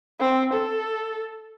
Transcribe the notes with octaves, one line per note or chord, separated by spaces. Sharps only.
C4
A4